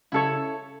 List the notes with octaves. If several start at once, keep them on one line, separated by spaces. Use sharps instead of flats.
C#3 E4 A4 C#5